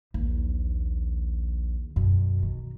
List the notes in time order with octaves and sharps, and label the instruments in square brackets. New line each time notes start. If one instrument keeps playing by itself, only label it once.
[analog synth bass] A#1 [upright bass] D#2
[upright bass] F#2 [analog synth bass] B2
[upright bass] D#3